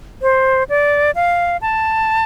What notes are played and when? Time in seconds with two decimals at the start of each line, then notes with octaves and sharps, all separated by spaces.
0.22 C5
0.69 D5
1.15 F5
1.62 A5